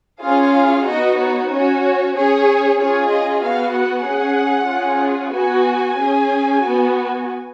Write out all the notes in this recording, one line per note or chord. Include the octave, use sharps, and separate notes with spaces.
C#4 F4 G#4 F5
B3 D#4 F#4 D#5
C#5
C#4 F#4 C#5
C#4 G#4 C#5
C#4 F4 G#4 C#5
D#5
B3 F#4 F5
F#5
C#4 G#4
C#4 F4 G#4
B3 F#4 G#5
C#4 G#4
B3 F#4